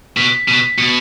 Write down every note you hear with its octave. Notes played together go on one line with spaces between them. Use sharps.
B2 B6
B2 B6
B2 C#7